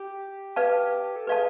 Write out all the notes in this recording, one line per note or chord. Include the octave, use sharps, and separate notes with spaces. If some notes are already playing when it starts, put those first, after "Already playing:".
Already playing: G4
B4 D5 F5 A5
A4
G#4 B4 D5 F5 A5